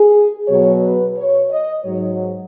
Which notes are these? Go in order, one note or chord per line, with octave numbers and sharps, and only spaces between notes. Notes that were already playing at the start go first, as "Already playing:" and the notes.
Already playing: G#4
B2 F#3 C#5
B4
C#5
D#5
G#2 F#3 C#5